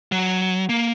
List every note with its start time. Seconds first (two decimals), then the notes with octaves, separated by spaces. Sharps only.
0.12 F#3
0.69 A#3